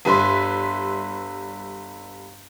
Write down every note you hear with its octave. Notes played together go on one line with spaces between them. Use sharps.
G1 G3 B4 E5 C6